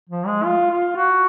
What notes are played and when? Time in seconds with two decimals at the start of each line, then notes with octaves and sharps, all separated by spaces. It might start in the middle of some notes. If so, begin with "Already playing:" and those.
0.09 F3
0.26 G#3
0.45 F4
0.71 F4
0.96 F#4